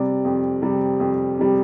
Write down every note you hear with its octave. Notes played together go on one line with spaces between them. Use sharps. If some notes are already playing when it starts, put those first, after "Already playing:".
Already playing: C3 G3 D5
F2
C3 G3
F2
C3 G3